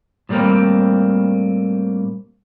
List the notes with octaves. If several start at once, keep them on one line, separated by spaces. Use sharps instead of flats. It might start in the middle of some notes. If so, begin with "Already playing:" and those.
A2 F#3 G3 A#3 C4